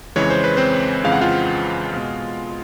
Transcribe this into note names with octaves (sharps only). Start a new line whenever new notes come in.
F2 C#3 E3 G#3 C#5
C5
B4
C4 C5
F2 C#3 E3 G#3 F5
F#5
F4 F5
B2 G#3